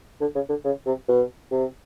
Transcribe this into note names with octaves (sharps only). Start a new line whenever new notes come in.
D3
C#3
D3
C#3
C3
B2
C3